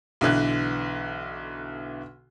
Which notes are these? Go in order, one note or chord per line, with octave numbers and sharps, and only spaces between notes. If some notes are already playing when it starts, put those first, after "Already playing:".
B1 D3 E3 F#6